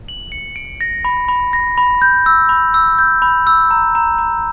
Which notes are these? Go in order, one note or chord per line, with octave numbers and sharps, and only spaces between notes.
F#7
C#7
D7
A#6
B5
B5
A#6
B5
G6
E6
B5
E6
G6
B5
E6
A#5
A#5
A#5